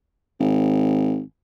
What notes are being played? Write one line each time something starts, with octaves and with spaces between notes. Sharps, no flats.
G#1